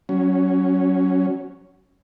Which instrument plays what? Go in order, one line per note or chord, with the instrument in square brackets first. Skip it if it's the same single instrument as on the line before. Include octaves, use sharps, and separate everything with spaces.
[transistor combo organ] F#3 C#4